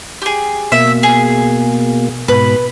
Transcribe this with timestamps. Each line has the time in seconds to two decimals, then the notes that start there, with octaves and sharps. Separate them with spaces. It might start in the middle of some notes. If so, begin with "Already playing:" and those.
0.22 G4 G#4
0.72 B2 A#3 E5
1.03 G#4
2.28 G#2 B2 B4 B5